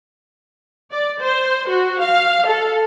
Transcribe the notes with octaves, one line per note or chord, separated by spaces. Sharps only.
D5
C5
F#4
F5
A4